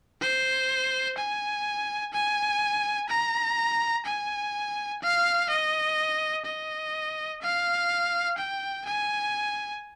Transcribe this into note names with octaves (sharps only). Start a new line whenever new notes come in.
C5
G#5
G#5
A#5
G#5
F5
D#5
D#5
F5
G5
G#5